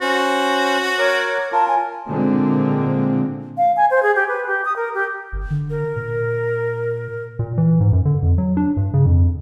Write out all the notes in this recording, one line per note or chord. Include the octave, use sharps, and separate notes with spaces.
C#4 F#4 C5
A#4 C#5 D6
F4 A#4 A5
G#5
A#2 D3 G#3 C4
F5
G#5
C5
G#4
G4
B4
G4
D#6
A#4
G4
G1
D3
A#4
A#2
A#2
E3
G#2
F#2
D3
F2
F#3
D4
G2
C#3
F2